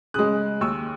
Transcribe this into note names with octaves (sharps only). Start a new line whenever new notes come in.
C#3 G#3 D#6 F#6
D#2 C#6 E6